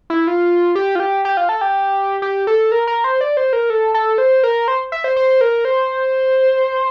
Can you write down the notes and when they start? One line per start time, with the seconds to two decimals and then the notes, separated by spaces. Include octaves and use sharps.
0.10 E4
0.27 F4
0.75 G4
0.95 F4
1.00 G4
1.25 G4
1.37 F4
1.49 A4
1.61 G4
2.22 G4
2.47 A4
2.72 A#4
2.87 A#4
3.04 C5
3.21 D5
3.37 C5
3.53 A#4
3.70 A4
3.94 A4
4.18 C5
4.43 A#4
4.68 C5
4.92 E5
5.04 C5
5.17 C5
5.41 A#4
5.65 C5